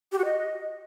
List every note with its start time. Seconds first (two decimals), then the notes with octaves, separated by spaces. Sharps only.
0.12 G4
0.18 F#4
0.25 D#5